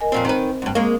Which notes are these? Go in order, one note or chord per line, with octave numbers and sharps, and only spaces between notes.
A#4 D#5 G#5
F2 A#2 C4
D#3 C4 B4 C5
D2 G2
G#3 A#3 C#6